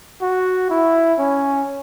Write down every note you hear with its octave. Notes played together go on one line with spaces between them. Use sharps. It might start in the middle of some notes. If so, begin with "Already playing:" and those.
F#4
E4
C#4